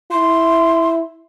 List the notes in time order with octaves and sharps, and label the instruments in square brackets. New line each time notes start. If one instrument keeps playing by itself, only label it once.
[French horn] E4 [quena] C6